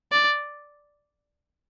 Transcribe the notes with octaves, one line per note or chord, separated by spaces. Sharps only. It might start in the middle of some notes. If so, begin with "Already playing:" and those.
D5